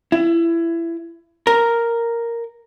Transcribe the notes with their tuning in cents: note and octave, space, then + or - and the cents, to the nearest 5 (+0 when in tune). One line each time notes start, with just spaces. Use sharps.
E4 +20
A#4 +0